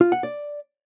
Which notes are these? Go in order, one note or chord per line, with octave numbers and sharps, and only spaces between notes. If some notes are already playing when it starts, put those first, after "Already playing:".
F4
F#5
D5